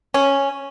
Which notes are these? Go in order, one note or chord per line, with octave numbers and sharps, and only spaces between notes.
C#4